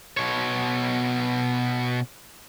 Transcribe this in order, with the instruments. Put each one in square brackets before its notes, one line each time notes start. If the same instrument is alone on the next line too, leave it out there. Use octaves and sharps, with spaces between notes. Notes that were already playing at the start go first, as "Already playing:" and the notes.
[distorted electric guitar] B2 C#5